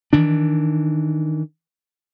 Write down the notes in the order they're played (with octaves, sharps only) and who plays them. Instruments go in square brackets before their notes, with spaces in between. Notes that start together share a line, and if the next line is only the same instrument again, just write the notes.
[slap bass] D#3 E3 D4